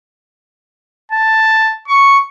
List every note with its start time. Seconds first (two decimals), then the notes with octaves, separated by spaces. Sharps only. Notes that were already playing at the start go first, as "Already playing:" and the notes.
1.12 A5
1.88 C#6